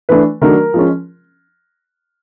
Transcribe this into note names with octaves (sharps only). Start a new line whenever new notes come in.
E3 A3 D4 B4
D#3 F#3 A3 D4 A#4
F3 G#3 C#4